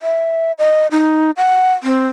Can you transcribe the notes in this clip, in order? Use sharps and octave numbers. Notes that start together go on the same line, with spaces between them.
E5
D#5
D#4
F#5
C4